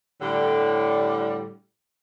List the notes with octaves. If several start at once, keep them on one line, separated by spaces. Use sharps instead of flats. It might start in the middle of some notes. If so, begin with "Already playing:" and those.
A2 D3 G3